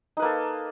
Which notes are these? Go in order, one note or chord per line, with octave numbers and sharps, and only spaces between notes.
A#3 D#4 A4 B4